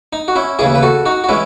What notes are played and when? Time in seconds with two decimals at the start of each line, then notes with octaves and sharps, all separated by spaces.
0.13 D#4
0.28 F#4
0.36 C#4 E4
0.59 D#2 C#3 E3 E4 G#4
0.75 B4
0.83 F#4 A4
1.06 D#4 F#4
1.24 F#4
1.29 E3 G#3 C#4 E4